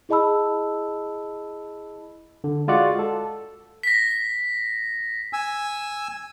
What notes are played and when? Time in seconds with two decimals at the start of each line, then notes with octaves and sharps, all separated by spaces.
0.09 E4 G#4 D#5 A5 B5 E6
2.44 D3
2.68 G#3 F4 F#4 D5 F#5
2.99 A4
3.83 A#6 B6
5.33 G#5 E6